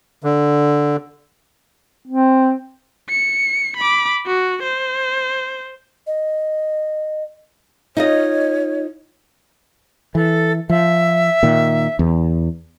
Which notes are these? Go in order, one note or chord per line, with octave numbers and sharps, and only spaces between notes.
D3
C4
C#7
B5 D6
F#4
C5
D#5
D#4 F4 C#5 D#5
E3 A4
F3 E5
A#2 D#3
E2